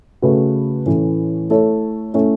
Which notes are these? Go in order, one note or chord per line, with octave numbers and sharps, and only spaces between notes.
C#3 A3 F#4 B4
A2 E3 A3 C#4
A3 E4 A4 C#5
A3 C#4 E4